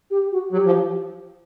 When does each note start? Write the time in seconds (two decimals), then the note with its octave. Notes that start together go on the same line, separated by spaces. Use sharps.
0.11 G4
0.32 F#4
0.52 F#3 G4
0.66 F3